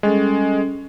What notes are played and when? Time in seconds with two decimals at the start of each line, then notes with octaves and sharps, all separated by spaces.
0.03 G3 G#3 C#4 A4